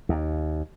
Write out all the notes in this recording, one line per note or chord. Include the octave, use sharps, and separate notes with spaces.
D#2